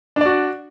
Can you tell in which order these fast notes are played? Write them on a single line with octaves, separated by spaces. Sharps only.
D4 D5 F#4